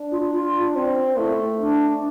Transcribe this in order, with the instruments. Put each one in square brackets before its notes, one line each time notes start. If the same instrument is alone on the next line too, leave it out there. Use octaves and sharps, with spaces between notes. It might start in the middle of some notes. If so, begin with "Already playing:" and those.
Already playing: [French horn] D4
[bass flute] F4
F4
[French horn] C4
[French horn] A3 [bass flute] E4
[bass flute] D4